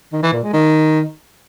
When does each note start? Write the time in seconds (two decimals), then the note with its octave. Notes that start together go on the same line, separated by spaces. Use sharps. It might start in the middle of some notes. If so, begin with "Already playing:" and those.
0.13 D#3
0.23 E3
0.33 A#2
0.43 G#3
0.53 D#3